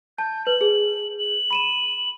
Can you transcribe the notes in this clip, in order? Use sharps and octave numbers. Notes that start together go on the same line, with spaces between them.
A5 G6
B4 F#7
G#4
F#7
B5 D#7 E7